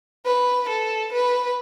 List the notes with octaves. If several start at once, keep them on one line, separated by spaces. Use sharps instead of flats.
B4
A4
B4